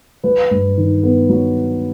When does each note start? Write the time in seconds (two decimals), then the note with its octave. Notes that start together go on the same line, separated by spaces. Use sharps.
0.24 F#3 B4
0.51 G2
0.77 D#3
1.03 B3
1.29 F#3